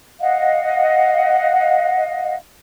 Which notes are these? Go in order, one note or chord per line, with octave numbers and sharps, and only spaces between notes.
D#5 F5 F#5